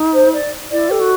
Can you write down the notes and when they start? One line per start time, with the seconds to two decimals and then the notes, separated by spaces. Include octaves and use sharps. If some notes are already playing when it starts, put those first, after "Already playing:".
Already playing: D#4
0.14 C5
0.33 D5
0.71 E4 D5
0.89 G4 A4
1.00 F#4